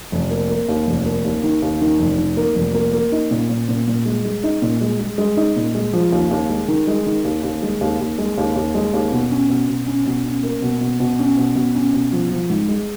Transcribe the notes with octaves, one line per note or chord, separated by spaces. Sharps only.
F1
A#3
A#3
D#2
F1
A#3
D#2
D#3
D#2
D#3
F1
D#3
A#3
F1
A#3
A#3
D#4
A#2
A#2
A#2
A#2
G#3
G#3
D#4
A#2
G#3
G#3
G#3
D#4
A#2
G#3
F3
D#2
D#2
G#3
D#3
G#3
D#3
D#2
D#2
G#3
D#2
D#2
G#3
D#2
D#2
G#3
D#2
B2
C#4
B2
B2
C#4
B2
C#4
A#3
B2
B2
B2
C#4
B2
B2
C#4
B2
F3
F3
G#2
G#3